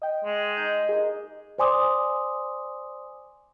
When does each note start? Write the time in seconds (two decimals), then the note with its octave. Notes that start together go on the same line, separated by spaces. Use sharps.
0.02 D#5 G5
0.25 G#3
0.57 D#4 G6
0.89 A#3 D#4 G#4 D#5
1.58 C5 D5 G#5 C6 D6 D#6